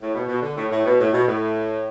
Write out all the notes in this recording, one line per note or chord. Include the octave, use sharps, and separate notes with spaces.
A2
B2
B2
D3
A2
A2
B2
A2
B2
A2